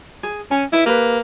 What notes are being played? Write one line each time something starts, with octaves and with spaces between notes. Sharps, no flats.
G#4
C#4 G#5
D#4 E4 B4
A#3 G4 B4